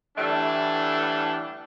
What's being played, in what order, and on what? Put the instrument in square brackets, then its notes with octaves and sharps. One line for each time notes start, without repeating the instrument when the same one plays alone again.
[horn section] A2 D3 E3 G3 A3 D4